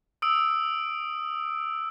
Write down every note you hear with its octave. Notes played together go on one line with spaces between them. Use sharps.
D#6 E6 D7